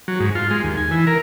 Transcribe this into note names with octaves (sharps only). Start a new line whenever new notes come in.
F#3
G#2
F4
G#3
D#2
G#5
E3
A#4